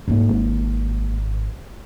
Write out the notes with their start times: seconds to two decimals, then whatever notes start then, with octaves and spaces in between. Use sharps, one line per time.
0.08 G#2 A#3
0.29 G#1